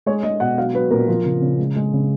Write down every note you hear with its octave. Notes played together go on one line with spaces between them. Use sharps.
G#3 C#5
G#3 D#5
B2 F#5
F#3 F5
F#3 B4
A#2 A#4
F3
C#3
C#3
G#3
G#3
C#3